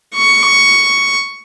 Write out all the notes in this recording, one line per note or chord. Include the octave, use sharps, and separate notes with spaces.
C#6